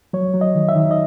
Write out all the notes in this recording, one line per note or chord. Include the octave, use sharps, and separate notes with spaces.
F#3 C#5
F#3
D#5
D#3
E5
D#3
D#5